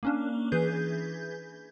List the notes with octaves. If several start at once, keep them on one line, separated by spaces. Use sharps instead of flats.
A#3 C#4 D4
E3 G#4 B4 G6